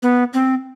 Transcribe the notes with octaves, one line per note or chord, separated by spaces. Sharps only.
B3
C4